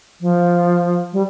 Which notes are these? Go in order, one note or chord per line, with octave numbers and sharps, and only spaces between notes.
F3
G3